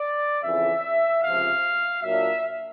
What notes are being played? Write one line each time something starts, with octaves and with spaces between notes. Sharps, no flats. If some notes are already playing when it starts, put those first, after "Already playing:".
Already playing: D5
F2 C#3 E3 E5
C#2 C3 F3 F5
A#2 F#3 A#3 D4 E5